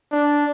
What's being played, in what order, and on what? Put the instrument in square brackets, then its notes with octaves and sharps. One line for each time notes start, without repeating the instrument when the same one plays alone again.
[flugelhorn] D4